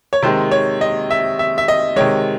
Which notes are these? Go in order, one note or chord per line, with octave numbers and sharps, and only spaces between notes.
C#5
C3 D#3 G#3 C5
C#5
D#5
E5
E5
E5
D#5
C3 D#3 G#3 C#5